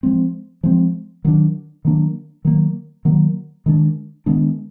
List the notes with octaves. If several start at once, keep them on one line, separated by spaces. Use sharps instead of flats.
F3 G#3 C4
F3 G#3 C4
D#3 F#3 A#3 D4
D#3 F#3 A#3 D4
D#3 F#3 A#3
D#3 F#3 A#3
D#3 G#3 B3 D4
D#3 G#3 B3 D4